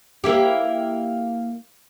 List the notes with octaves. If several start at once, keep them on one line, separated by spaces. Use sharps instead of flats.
A#3 E4 G4